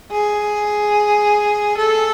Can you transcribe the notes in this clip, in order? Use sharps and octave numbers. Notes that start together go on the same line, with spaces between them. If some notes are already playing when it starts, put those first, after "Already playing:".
G#4
A4